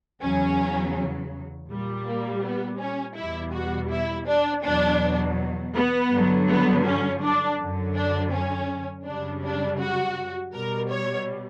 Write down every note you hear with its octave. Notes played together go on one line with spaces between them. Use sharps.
E2 C#3 F#3 C#4
A#2 G3
A#3
B3
C#4
E2 B2 G3 E4
F#4
E4
D4
E2 B2 F#3 D4
B3
G2 D3 F#3
B3
C#4
D4
F#2 D3 F#3
D4
C#4
F#2 C#3 G3 D4
D4
F#4
B2 G3 A#4
C#5